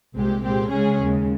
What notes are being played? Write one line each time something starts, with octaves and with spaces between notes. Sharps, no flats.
C2 A#2 G#3 C4 G4
A#2 G#3 C4 G4
C#3 G#3 C#4 G#4
D#2 C#3 G#3